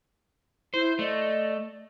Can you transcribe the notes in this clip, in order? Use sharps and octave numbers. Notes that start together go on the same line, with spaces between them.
E4 C5 G6
A3 D5 D#5